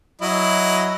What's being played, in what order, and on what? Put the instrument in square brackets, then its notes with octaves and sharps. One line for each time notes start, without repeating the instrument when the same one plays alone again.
[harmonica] F#3 E4 D#5